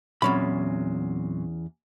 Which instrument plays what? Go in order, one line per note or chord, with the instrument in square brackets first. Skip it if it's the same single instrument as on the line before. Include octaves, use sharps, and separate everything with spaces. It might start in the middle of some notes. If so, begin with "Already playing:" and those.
[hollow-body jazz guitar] E2 C#4 B5 [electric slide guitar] A#2 F#3 C4